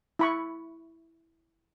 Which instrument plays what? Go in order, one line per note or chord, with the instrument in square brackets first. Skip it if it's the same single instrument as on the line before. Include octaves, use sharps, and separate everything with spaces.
[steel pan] E4 B5 C#6